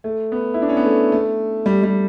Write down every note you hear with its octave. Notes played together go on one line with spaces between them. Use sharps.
A3
B3
E4
D4
C#4
B3
A3
A3
G3
G3